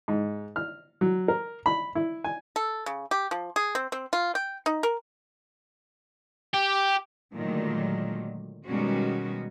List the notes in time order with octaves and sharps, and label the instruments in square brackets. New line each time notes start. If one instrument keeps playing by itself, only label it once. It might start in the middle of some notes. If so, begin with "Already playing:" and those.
[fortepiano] G#2
F6
F#3
A#4
B5
E4
G#5
[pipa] A4
C#3
G4
F3
G#4
C4
C4
F4
G5
D#4
A#4
[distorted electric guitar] G4
[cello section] A#2 D3 D#3 F#3 G#3 A3
B2 D#3 G3 G#3 C#4 F#4